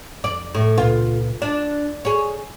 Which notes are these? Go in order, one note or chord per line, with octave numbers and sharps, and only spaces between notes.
F2 D5
A2
C#2 A#2 F4 B4
D4 D5
G#4 C#5